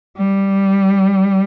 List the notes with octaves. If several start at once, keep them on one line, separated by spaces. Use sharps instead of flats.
G3